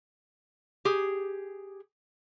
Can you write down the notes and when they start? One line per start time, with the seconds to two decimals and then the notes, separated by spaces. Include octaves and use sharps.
0.85 G4 G#4